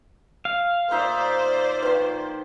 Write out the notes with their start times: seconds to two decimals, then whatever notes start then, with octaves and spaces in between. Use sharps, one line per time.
0.45 F5
0.91 A#2 D#4 C5 D5 E5
1.83 D#3 F3 B4